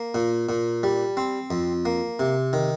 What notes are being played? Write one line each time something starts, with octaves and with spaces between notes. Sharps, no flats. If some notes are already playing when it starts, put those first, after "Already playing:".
Already playing: A#3
A#2
A#2
G3
C4
F2
A#3
C3
D#3